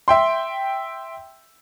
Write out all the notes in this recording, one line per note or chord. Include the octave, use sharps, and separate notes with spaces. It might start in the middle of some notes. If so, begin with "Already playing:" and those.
E5 G5 C6